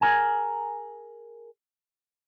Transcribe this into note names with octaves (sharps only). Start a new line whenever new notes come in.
G#4 A#4 G#5